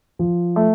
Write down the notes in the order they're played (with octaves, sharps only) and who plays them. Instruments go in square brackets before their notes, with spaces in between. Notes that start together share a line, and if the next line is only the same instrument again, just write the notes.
[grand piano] F3
A3